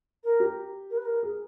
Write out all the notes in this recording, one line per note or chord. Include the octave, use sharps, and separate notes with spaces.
A#4
G4
A#4
B4
A#4
G#4